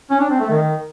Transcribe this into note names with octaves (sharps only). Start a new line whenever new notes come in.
C#4
D4
C4
A3
D#3